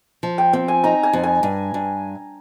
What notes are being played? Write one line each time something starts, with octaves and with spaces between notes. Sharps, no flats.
F3
G5
C4 G5
G#5
D#4 A#5
G#5
F2
G#5
G2
G2